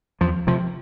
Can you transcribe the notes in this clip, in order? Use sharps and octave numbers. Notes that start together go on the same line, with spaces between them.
E2 F3
C3 F3